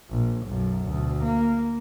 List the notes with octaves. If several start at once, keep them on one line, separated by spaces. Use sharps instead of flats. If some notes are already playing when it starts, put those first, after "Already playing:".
A#1
B1 F#2
D2 B2
A#3